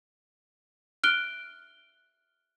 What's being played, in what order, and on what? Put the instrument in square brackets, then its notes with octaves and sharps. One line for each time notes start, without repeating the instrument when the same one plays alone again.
[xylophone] F6 F#6 D7 G7